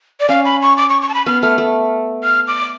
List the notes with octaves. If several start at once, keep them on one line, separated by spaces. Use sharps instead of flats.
D5
C#4 F5
B5
C#6
D6
C#6
C#6
A5
B5
B3 F6
A3 F6
A3
F6
D6